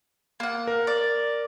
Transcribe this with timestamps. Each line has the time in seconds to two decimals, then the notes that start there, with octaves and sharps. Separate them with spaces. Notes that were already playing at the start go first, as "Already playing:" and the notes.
0.40 A#3 F#5
0.67 A#4
0.87 D5